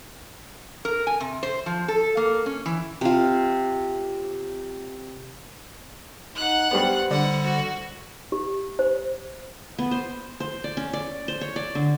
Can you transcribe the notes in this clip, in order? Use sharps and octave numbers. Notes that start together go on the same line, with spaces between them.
A#4
G#5
C3
C5
F3
A4
A#3
C#4
E3
C3 F4
D#4 F#5 F#6
G2 G3 B3 C5
D3 G3 D4 F#5
F#4
G4
C5
B3
C5
C5
D5
C#4
D5
C5
C#5
D5
D3